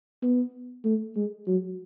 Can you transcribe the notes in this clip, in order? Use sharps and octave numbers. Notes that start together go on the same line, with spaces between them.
B3
A3
G#3
F#3